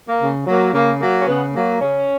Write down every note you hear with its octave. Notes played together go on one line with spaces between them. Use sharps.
A#3
C#3
F#3 A#3
C#3 A#3
F#3 A#3
C#4
C#3 B3
F#3 A#3
C#3 C#4